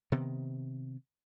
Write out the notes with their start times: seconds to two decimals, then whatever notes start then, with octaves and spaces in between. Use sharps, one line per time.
0.12 C3 D#3 B3